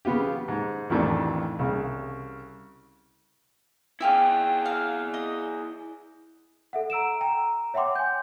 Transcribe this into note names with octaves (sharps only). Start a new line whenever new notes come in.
C#3 F3 B3 F4 G4
G#2
A1 F2 D#3 E3 A3 D4
C2 C#3
E4 F4 G4 G#4 E5
F5
D#5
A4 E5 F#5
A#5 E6 D7 E7
G5 A#5
C#5 E5 F#5 G5 C6 D6
G#5 G6